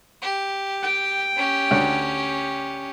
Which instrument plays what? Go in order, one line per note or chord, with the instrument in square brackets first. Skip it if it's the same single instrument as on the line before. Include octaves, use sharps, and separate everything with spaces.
[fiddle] G4
[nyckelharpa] G5
[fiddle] C#4 G4
[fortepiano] D2 C#5